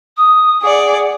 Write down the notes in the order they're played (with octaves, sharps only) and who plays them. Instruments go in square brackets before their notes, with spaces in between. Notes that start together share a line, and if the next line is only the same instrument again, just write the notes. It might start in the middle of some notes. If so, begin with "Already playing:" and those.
[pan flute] D#6
[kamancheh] G#4 D5 [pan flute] F#5